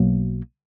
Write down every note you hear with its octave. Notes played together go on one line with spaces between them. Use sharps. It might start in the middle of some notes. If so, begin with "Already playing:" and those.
Already playing: B1 B2 F#3 A#3